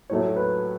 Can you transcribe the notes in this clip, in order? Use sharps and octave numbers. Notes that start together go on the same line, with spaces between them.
A2 F#3 A3 C#5
B4